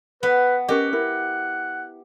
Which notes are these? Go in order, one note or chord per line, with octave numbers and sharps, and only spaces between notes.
B3 B4
C#4 G4 A#4 D#5 F#5
E4 A#4